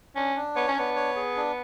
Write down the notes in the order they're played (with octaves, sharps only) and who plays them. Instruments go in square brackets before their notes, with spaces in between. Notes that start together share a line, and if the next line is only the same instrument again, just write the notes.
[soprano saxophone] C#4 [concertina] D4
[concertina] D4
[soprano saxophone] B3 [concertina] C#5
[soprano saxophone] C#4
[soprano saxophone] B3 [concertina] D4
[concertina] C#5
G#4
D4